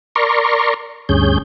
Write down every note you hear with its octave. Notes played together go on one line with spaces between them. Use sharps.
A#4 D5 A#5 C6 C#6
D2 G2 C#4 G#4 G6